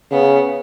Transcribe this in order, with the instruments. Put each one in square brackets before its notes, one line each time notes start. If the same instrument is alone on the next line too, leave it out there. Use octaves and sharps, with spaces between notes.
[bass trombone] C#3 [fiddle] B3